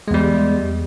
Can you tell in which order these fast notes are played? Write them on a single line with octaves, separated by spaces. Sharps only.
G#3 E2 G3